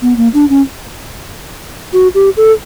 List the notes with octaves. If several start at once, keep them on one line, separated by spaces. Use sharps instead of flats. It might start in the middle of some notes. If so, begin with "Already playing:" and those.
B3
A#3
D4
C#4
F#4
G4
A4